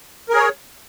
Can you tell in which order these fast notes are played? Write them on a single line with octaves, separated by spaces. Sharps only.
A#4 G#4 C#5